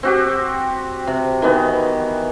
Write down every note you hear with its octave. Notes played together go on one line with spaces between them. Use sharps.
C4 F#4 G4
C3
D#3 E3 B3